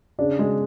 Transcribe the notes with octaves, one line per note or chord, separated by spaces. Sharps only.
C#3 D4
G#3